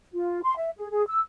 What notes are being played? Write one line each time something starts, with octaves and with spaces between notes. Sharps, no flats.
F4
C6
E5
G#4
G#4
E6